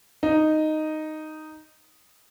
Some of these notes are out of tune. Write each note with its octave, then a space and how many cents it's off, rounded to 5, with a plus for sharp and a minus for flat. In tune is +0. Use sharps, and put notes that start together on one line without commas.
D#4 -5